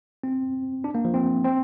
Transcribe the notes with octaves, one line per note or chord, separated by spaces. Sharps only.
C4
D4
A#3
F3
C4
C4